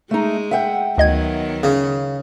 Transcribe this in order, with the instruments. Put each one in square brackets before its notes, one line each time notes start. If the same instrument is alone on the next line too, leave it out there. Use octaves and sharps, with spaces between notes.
[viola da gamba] G#3 [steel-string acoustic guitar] A3 D#4
[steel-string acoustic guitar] E5 F#5 G5
[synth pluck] D2 D#5 G#6 [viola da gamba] D#3 F#3 B3
[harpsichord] C#3